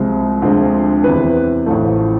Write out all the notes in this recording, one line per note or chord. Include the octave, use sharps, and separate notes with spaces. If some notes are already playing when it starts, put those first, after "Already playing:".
Already playing: C2 C3 F3 G#3
D2 C3 F3 G#3
E2 C3 E3 B4
A1 A2 F3 A3